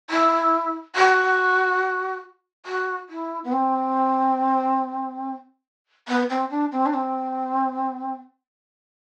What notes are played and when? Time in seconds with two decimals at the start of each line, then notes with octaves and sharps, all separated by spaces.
0.10 E4
0.96 F#4
2.66 F#4
3.09 E4
3.44 B3
3.52 C4
6.08 B3
6.30 C4
6.50 D4
6.72 C4
6.86 D4
6.94 C4